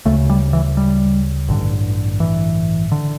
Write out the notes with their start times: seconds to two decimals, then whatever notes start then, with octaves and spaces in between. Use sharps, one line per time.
0.05 D2 C#3 A3
0.30 G3
0.53 E3
0.77 G3
1.49 A1 G2 D3
2.20 E3
2.92 D3